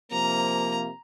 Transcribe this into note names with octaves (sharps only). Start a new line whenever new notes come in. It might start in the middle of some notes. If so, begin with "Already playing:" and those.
C3 F3 A#3 A#5